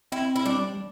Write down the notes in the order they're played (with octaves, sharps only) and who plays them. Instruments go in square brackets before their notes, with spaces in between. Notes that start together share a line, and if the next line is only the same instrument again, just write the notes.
[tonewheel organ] C4 [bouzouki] E4
[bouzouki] E4
[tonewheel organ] G3 [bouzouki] D4